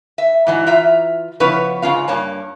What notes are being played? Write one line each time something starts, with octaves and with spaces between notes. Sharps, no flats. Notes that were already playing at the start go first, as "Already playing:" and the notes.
E5
G#2 E3 F#3
E3 F4 E5 A#5
C#3 F3 B3 E4 B4 C#5
G#2 C#3 C#4 F4 F5
G2 A#3 C#5 A5